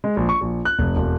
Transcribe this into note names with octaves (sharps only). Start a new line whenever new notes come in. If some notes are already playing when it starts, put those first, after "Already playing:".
G#3
A#1
C#6
A#1
F#6
F1
E1